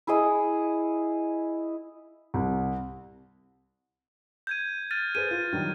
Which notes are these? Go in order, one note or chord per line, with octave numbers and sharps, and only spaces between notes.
E4 G#4 D#5
C2
G6 G#6 D#7
F6 A6 D#7
G#4 B4 C5 D#7
F4
D#3 F#3 G3